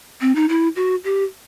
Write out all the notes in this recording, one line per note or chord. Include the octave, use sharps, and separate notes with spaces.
C4
D#4
E4
F#4
G4